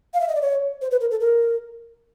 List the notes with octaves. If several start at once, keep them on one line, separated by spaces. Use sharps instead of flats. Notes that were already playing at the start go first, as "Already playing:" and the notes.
F5
E5
D#5
D5
C#5
C5
B4
A#4
A4
A#4